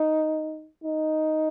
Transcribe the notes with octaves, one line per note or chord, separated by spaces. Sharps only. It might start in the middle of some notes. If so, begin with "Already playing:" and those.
Already playing: D#4
D#4